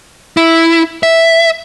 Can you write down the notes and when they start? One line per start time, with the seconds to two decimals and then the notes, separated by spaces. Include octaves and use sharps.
0.37 E4
1.03 E5